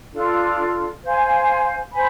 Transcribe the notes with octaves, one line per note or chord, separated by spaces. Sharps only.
D4 F4 A4
C5 F5 G#5
C5 G#5 B5